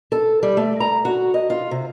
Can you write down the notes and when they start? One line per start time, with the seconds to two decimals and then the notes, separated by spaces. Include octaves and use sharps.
0.12 A4
0.43 G3
0.57 A3
0.80 A#5
1.05 F#4
1.34 D#5
1.50 F4
1.71 C3